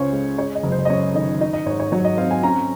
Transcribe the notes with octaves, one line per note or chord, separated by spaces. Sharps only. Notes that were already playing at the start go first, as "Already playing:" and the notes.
Already playing: C#2 C#3 C#4 C5 C#5
G#3
G#3 C#5
D#5
F#1
C5
D#5
F#2 C#5
D#3 D#5
D#4 D#5
D#5
G#2 C#5
C#5
F#3 C#5
D#5
C4 F5
G#5
C#4 A#5